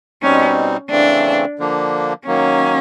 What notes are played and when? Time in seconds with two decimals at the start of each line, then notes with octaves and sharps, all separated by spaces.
0.22 B2 G3 C4 C#4 D#4
0.91 C#3 E3 A3 C4 D4
1.59 D3 F3 A#3 D4
2.27 D#3 F#3 A#3 C#4